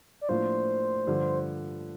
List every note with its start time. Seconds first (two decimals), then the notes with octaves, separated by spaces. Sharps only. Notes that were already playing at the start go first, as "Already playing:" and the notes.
0.21 D5
0.29 A2 F3 A#3 D4 F4 C5
1.07 G2 D3 F3